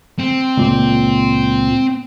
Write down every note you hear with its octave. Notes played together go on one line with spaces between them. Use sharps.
C4
C#2 A#2